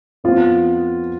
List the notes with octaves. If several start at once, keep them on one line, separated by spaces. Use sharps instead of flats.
F2 F3 B3 F4